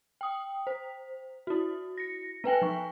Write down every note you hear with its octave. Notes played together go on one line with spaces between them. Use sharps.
G5 D#6
C5
E4 F#4
A#6 C#7
B3 B4 G5 G#5
F3 C#6